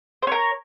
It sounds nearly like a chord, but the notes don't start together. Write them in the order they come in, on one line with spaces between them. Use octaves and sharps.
C5 C#5 A#4